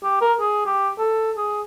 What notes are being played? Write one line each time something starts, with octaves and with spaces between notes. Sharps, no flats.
G4
A#4
G#4
G4
A4
G#4